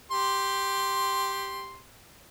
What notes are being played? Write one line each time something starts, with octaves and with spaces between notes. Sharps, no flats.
G4 C6